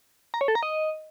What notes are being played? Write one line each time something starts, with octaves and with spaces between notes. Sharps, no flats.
A#5
C#5
A4
A#5
D#5